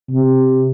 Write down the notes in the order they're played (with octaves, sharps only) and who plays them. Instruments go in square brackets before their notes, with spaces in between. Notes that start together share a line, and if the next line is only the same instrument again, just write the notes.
[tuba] C3